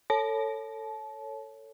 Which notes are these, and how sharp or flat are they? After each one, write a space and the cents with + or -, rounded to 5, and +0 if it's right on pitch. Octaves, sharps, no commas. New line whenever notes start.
A4 +20 C#5 +0 A5 -30